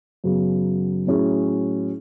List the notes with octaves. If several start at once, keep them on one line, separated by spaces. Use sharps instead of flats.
F#2 C#3 F#3 B3
A2 F#3 C#4 E4 G#4